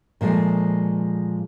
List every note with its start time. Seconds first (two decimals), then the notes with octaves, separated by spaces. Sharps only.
0.21 A#2 F3 G#3 A3